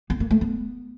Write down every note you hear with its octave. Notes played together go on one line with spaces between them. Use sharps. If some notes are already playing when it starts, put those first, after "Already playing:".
B3
A#3
A3
B3